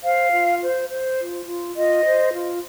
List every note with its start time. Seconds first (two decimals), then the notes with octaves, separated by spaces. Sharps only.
0.02 C5 F5
0.32 F4
0.61 C5
0.89 C5
1.18 F4
1.46 F4
1.75 F4 D#5
2.04 C5
2.33 F4